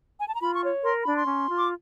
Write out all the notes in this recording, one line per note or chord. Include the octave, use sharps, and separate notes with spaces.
G#5
A5
A#5
F4 B5
C#6
C#5
A#4 C6
D4 B5
C6
C#4
F4
D6